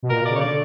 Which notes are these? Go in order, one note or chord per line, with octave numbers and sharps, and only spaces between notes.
B2
A#2 A#4
B2
C#3 D5
C#5
D3 D5